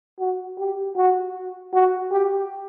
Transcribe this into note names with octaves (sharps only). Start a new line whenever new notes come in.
F#4
G4
F#4
F#4
G4